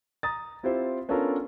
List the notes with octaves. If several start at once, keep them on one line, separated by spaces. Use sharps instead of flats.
A#5 D#6 A6
C4 E4 F4 G4 C5
B3 C#4 D4 F4 A4 A#4